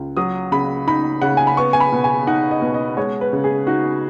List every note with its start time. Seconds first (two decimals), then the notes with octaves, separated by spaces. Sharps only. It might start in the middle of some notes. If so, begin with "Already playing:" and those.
Already playing: C#2
0.17 F#3 D#6
0.52 C#3 B5
0.87 D#4 B5
1.22 C#3 F#5
1.37 G#5
1.47 B5
1.57 B3 C#6
1.73 G#5
1.80 B5
1.92 B2
2.04 G#5
2.27 D#4 F#5
2.51 D#5
2.62 B2
2.74 D#5
2.97 G#3 C#5
3.21 B4
3.33 C#3
3.44 G#4
3.67 D#4 F#4